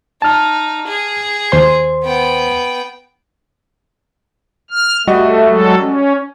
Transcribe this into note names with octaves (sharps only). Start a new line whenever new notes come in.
D#4 A5 F6
G#4
D#2 C5 C6
B3 G5
F6
G3 A3 F#4 D#5
F#3 G#3 A4
C#4